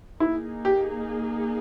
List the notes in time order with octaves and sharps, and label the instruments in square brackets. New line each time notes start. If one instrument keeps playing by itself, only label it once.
[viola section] A#3 D#4 G#4 [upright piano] E4
[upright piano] G4